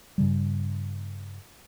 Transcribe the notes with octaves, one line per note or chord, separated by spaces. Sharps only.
G2 C#3 G3